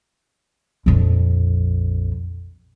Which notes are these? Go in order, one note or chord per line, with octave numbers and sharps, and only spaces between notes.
A#1 F2